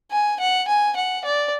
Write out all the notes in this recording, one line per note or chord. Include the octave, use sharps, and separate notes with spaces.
G#5
F#5
G#5
F#5
D5